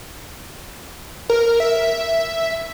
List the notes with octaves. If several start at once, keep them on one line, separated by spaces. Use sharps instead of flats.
A#4
E5